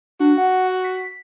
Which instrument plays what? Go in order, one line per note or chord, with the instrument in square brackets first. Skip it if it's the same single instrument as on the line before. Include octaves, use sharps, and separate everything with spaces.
[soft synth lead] D4 [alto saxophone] F#4
[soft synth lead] F#5
B6